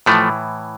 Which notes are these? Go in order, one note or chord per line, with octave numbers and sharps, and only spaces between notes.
A2 E3 F3 A3